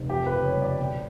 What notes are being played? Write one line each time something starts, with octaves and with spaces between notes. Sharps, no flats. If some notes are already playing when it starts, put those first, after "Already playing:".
Already playing: F1
F2 G4
B4
F#1
C#5
G3
D5
B2 G5